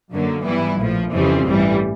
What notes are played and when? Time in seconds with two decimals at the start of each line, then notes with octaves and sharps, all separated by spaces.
0.12 F#2 D3 F#3 A#3
0.45 G#2 E3 G3 B3 E4
0.79 A#1 A2 F3
1.12 F2 C#3 E3 G3 C4
1.45 A1 G2 E3 G3